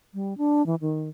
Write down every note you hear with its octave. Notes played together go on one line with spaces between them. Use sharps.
G3
D4
E3
D#3